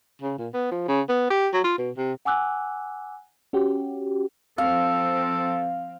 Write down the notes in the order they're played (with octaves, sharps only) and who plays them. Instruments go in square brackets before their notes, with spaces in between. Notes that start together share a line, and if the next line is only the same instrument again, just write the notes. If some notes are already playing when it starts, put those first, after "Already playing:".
[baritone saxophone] C#3
A#2
B3
F3
C#3
B3
G4
F#3
F4
B2
C3
[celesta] F#5 G#5 D6 E6 F#6
[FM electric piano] C#4 F#4 G4
[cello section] F3 C4 [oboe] A4 [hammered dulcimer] F5